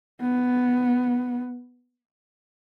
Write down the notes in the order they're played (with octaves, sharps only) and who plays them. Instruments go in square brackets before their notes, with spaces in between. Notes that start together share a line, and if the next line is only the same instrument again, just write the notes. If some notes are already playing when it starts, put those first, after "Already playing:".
[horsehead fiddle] B3